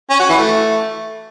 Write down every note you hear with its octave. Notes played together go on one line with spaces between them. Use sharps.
C#4
F#4
E3
A3